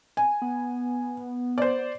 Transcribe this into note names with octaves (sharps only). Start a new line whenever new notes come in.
G#5
B3
C5 D5